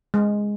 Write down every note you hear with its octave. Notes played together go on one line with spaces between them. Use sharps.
G#3